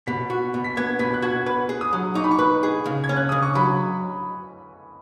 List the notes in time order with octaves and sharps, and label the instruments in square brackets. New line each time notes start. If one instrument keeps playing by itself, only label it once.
[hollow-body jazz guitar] B2 [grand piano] B6
[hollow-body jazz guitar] F#4
B2
[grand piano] B6
[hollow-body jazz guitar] B3 [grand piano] G#6
[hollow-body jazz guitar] B2 [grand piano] B6
[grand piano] F#6
[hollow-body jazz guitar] F#4 [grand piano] G#6
[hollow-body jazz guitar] B4 [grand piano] F#6
[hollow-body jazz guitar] G#4
[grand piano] D#6
[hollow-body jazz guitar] F#3
[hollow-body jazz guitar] D#4 [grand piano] C#6
[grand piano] B5
C#6
[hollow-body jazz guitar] B4
G#4
C#3
[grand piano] G#6
[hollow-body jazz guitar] C#4
[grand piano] F#6
[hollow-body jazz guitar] C#3 [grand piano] D#6
[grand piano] C#6
[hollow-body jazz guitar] F#3 [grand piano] B5